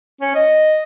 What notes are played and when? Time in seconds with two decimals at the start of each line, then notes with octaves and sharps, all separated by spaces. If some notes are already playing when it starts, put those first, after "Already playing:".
0.21 C#4
0.35 D#5